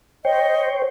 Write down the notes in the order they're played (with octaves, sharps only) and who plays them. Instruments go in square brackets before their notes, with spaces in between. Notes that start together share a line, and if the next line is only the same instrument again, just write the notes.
[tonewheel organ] C5 C#5 G5 [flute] D#5